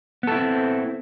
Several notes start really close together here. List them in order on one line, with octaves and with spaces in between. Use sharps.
B3 A4 E4 C4